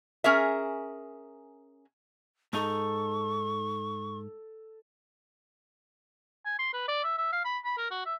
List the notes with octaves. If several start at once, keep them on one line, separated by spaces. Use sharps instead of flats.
C#4 G#4 A#4 E5
G#2 D#4 A4 C#6
G#5
C6
B4
D5
E5
E5
F5
B5
B5
A#4
F#4
E5